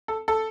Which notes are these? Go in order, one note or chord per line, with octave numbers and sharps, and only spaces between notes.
A4
A4